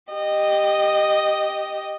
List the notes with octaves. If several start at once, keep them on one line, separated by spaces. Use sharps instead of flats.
G4 D#5